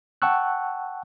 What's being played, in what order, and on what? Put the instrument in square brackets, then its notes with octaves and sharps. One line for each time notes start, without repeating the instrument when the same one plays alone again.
[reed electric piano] F#5 G5 A5 C#6 E6 F#6